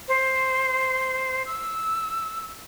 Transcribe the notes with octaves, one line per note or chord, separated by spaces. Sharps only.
C5
E6